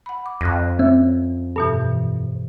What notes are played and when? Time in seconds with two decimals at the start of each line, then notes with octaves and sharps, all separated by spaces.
0.06 F#5 B5
0.26 D6
0.41 F2 F#6 A#6
0.79 C4 C#4 E5
1.56 G2 B2 E3 A4